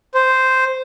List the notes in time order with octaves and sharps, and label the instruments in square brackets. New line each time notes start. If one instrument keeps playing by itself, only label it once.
[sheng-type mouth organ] C5